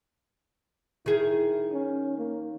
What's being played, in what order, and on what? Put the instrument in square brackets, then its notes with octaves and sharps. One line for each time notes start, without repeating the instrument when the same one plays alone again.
[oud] D#3 G#4 [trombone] E4
[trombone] C#4
A#3